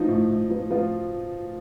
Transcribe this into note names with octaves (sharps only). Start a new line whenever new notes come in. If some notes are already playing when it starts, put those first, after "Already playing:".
Already playing: F3 D#4
A2
A2
F3
F3 F4